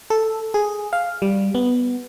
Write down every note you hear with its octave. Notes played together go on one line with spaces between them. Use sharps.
A4
G#4
F5
G3
B3